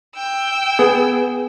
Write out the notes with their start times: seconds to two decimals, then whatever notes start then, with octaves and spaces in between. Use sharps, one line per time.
0.16 G5 E6
0.79 B3 G#4